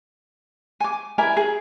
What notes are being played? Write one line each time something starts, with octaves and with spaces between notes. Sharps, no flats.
G#5 D6
E4 A#4 D5 G#5
G#4